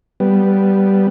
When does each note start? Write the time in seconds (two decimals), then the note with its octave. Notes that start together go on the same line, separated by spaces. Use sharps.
0.20 G3 B3